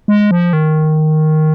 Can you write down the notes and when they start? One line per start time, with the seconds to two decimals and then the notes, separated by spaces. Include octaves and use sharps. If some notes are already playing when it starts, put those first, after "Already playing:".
0.08 G#3
0.31 F3
0.53 D#3